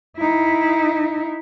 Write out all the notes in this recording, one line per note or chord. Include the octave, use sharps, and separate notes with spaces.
D#4 E4